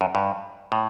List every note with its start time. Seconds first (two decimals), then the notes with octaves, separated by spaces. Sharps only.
0.01 F#2
0.15 G2
0.72 A2